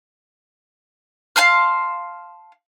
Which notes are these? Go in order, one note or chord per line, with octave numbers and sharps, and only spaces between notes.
F5 A5 C6 F6